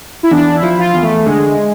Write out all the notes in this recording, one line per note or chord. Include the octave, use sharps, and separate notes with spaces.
E4
E2 D4
E4
F3
F4
E2
A3
D3 G#3